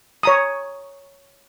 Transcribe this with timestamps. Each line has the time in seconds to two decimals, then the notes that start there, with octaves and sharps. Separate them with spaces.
0.23 C#5 A#5 D#6